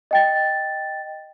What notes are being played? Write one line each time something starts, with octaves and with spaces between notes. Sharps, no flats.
D#5 G5 A6